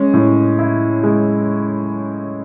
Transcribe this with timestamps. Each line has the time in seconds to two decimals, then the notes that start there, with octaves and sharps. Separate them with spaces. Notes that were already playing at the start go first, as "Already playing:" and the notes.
Already playing: G#3 C#4
0.14 A2
0.59 E4
1.03 G#3